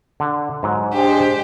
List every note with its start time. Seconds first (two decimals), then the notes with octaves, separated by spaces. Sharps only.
0.20 D3
0.63 G#2 F#3
0.93 G#3 D4 G4 C5